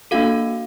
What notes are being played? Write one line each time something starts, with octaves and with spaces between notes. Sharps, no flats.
A#3 D4 F#4 A4 F5